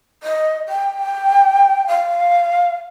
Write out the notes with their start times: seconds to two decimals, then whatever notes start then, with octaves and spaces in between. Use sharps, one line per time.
0.23 D#5
0.68 G5
1.88 F5